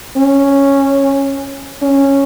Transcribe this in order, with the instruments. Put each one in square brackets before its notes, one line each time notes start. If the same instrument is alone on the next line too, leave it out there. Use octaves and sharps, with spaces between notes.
[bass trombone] C#4
C#4